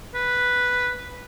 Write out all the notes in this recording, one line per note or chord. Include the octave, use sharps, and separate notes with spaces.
B4